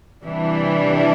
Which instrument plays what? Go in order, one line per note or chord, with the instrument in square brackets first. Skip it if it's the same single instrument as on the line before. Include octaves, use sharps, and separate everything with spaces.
[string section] C3 E3 G3 D4